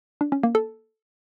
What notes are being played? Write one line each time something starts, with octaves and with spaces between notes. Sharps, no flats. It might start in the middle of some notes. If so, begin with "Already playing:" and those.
D4
C#4
A#3
A4